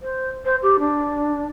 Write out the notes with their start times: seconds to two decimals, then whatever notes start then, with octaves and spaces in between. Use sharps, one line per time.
0.01 C5
0.45 C5
0.63 G4
0.79 D4